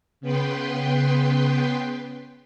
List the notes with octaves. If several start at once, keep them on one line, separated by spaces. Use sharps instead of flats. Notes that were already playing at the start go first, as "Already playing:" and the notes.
C#3 B3 B4 G5 C6